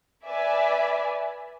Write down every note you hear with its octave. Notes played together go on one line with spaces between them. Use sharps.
B4 D5 E5 G#5